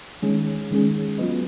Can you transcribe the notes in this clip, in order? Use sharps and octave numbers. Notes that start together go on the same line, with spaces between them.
D#3 G#3 C#4 G#4
D#3 G#3 C#4 G#4
F#3 B3 F4 B4 D#5